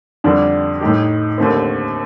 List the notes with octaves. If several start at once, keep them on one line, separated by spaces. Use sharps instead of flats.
F2 D3 G3 D4
A2 A3 D#4 G4
D#2 D3 A3 C4